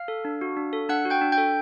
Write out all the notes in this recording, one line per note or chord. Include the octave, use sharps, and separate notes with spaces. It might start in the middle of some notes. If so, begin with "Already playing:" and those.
Already playing: F5 F6
A4
D4
F#4
D4
A4
D4 F#5 F#6
F#4
G5 G6
D4
G5 G6
A4